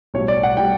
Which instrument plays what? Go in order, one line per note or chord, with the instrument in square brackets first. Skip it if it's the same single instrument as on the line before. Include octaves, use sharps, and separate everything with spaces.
[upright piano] B1 A2 G3 [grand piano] C#5
[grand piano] D5
F#5
[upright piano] A2 G3 [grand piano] G5